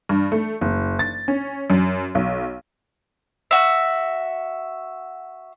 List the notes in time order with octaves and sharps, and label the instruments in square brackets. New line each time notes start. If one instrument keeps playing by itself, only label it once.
[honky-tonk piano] G2
A3
F#1
A6
C#4
F#2
B1
[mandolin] F#4 E5